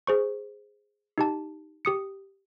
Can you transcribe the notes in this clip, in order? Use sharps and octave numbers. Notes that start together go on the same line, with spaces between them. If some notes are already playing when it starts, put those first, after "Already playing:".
G#4 C5 C#6
D#4 G4 A5
G4 D#6 C#7